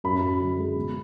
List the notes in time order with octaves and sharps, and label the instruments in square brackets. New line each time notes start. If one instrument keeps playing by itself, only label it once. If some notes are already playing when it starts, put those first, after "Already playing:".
[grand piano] F#2 B5
F#2
D3
G#3
B2